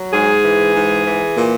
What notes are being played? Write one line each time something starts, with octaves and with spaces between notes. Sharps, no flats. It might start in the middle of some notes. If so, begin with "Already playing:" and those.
Already playing: F#3
G#2 G#4
E3
G#2
E3
A#2